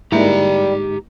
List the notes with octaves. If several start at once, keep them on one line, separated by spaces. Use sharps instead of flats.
G#2 G3 G#3 A#3 D#4 E4 G4 A#5